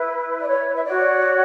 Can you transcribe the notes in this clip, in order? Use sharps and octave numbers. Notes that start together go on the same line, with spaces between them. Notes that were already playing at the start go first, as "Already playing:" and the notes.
Already playing: E4 B4
D5
C#5
E5
F#4 C#5 D5